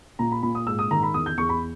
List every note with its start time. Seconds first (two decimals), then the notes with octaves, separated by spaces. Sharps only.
0.19 A#2 A#5
0.32 B5
0.43 A#2 B5
0.55 D#6
0.67 G#2 E6
0.79 D#6
0.91 D#3 A#5
1.03 B5
1.14 E2 D#6
1.26 G6
1.37 E2 C#6
1.49 B5